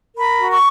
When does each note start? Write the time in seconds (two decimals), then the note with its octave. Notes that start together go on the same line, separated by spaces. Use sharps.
0.15 A#4 B5
0.38 F#4
0.50 C#6